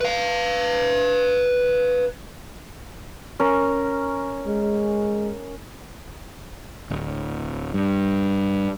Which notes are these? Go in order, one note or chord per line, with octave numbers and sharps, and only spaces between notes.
B4 F5
C#4 A#4
G#3
D1
G2